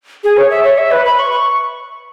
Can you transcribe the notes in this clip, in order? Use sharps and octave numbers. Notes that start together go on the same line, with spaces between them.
G#4
C#5
E5
C#5
E5
B4
B5
C#6
C#6